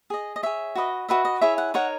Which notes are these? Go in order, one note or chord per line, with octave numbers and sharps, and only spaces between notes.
G#4 D#5
D#5
G#4 C#5 E5
F#4 B4 D#5
F#4 B4 D#5 E5
D#5
E4 G#4 C#5 E5
F#5
D#4 A#4 C#5 F#5